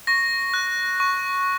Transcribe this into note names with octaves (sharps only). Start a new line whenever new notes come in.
C#6 A#6
F#6
C#6